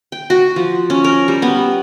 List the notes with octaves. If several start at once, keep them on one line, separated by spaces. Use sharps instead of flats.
G5
F#4
F3
C#4
A#4
G3
B3